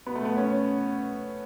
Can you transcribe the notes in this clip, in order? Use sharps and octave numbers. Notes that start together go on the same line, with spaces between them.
B2 B3
A3
B3
C#4